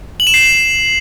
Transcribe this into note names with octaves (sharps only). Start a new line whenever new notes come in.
F#7
E7
C7
F#7